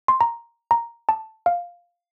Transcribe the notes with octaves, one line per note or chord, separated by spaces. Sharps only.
C6
A#5
A#5
A5
F5